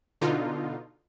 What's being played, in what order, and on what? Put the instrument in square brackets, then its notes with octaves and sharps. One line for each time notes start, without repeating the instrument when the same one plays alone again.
[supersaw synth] B2 D3 D#4 F4